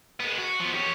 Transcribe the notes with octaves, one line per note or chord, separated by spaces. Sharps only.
G#3 B3
F#4
F3 B3
G4 C#5